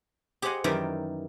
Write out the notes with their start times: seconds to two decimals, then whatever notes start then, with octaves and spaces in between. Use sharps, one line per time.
0.42 G4 G#4 C5 D#5 F#5 G#5
0.64 F#2 D#3 E3 G3 G4 G5